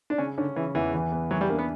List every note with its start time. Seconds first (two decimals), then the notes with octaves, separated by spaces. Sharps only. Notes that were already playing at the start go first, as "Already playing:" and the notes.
0.10 D4
0.18 C#3 C#4
0.38 D3 C#4
0.56 C#3 E3
0.75 E2 E3
0.94 E3
1.12 B3
1.31 E3 F#3
1.41 G3
1.50 A#3 D4
1.59 B3